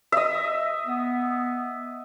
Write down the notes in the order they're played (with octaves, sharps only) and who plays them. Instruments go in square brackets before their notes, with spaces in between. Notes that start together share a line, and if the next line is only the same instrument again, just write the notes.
[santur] D#5 E5
[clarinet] B3